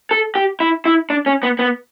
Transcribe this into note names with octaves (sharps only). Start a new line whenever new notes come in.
A4
G4
E4
E4
D4
C#4
B3
B3